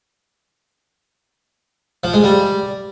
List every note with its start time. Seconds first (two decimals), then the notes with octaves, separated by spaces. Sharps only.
2.04 F3
2.14 G#3
2.24 G3